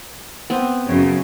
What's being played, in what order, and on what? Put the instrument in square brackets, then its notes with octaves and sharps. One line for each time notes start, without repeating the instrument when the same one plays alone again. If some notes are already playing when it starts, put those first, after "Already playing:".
[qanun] B3 C4
[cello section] F#2 C#3